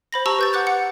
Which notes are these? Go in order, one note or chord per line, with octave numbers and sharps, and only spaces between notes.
C5 B5 A#6
G4 A5 A#5 C#6 E6
B4 G6 A6
F#5 D6 F#6 A6
F#5 C#7